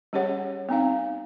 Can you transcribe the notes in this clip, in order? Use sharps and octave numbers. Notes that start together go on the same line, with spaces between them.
G3 C#4 G4 G#4 C#5 F#5
B3 C4 D#4 F5